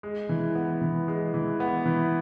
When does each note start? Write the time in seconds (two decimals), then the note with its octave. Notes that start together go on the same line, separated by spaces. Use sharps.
0.03 G#3
0.29 E3
0.55 B3
0.81 E3
1.08 G#3
1.34 E3
1.60 B3
1.86 E3